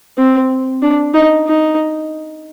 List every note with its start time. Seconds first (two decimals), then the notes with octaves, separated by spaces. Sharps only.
0.18 C4
0.83 D4
1.14 D#4
1.47 D#4